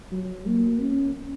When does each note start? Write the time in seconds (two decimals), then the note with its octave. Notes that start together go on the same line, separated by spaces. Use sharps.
0.12 F#3
0.46 A#3
0.81 C#4